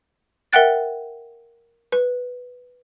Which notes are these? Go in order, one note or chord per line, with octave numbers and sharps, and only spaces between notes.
A#4 E5 F#5 G5 F#6 A6
B4